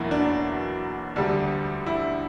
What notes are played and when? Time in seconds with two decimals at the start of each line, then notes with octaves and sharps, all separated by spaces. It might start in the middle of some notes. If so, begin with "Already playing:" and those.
Already playing: E2 B2 F#3 A#3 E4
0.11 D4
1.16 D2 D3 G3 D4
1.86 E4